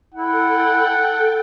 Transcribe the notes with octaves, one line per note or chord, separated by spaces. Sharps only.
E4 A4 F#5 G5